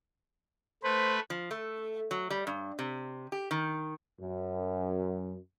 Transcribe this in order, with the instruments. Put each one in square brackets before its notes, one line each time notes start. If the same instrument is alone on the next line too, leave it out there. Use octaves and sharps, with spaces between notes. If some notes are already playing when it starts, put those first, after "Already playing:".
[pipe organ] A3 B4 [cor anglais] C5
[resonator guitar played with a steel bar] F3
A3
F#3
G3
G2
C3
G4
D#3
[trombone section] F#2